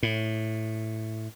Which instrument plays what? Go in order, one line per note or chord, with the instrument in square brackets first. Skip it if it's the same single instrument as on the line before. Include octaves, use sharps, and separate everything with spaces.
[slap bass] A2